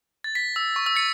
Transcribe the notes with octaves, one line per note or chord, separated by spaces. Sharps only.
A6
B6
E6
C#6
E6
A6 C#7